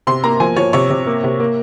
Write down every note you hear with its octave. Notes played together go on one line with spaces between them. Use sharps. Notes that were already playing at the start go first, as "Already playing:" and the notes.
C3 C6
A#3 A#5
F3 G#5
F3 C#5
C3 C#5
C3
A#3
C3
A#3